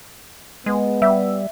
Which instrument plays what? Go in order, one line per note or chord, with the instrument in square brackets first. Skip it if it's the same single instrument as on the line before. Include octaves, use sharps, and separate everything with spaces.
[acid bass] G#3 [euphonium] B3
[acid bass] G3 [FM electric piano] E5